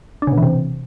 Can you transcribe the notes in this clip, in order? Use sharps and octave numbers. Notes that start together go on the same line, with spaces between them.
D4
C#3
B2
E3
C3